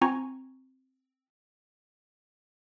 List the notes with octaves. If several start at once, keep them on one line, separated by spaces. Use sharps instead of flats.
C4 F4 G#5 A#5 C#6 G#6